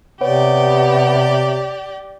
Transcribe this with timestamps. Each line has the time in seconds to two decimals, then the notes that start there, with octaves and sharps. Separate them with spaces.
0.21 C3 B3 G4 C#5 D5